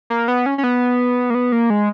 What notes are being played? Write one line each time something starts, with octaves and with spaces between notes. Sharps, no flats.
A#3
B3
C#4
C#4
B3
A#3
B3
A#3
G#3